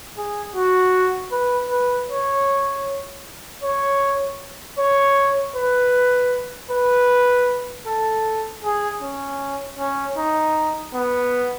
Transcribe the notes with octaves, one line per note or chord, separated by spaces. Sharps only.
G#4
F#4
B4
B4
C#5
C#5
C#5
B4
B4
A4
G#4
C#4
C#4
D#4
B3